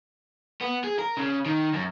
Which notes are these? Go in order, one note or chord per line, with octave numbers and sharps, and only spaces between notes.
B3
G#4
A#4
C#3
D#3
F#2